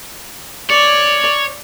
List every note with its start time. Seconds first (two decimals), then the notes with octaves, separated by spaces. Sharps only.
0.70 C#5 D5